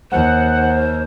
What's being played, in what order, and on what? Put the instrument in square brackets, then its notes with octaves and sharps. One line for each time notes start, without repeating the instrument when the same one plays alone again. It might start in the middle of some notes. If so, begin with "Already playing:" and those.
[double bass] D#2 [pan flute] C5 [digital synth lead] F#5